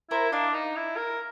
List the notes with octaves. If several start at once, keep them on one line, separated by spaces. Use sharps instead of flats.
E4 A#4 C5
D4 D#5 F5
D#4
E4
A#4